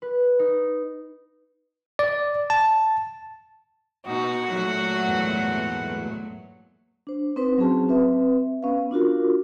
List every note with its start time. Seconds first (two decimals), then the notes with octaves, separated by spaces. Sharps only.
0.02 B4
0.39 D#4
1.99 D5
2.50 A5
4.06 B2 D#4 F#4
4.48 A#2 F#3 A3 F#5
5.07 E2 G#2 B3
7.07 D4 C5
7.36 C4 D#4 B4 C5 C6
7.58 F#3 C4 C#4 F#4 G#4 A5
7.89 C4 B4 E5
8.63 B3 C#4 B4 F5
8.91 D4 F4 F#4 A#4